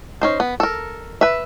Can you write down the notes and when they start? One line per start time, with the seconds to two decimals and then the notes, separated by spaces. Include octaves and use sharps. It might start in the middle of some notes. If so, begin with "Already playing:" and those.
0.21 C#4 D#4 C5
0.40 B3
0.60 A4 A#4
1.21 B4 E5